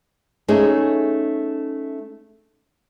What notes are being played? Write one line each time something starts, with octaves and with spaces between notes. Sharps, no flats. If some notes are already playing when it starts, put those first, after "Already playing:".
A3 C#4 D#4 G#4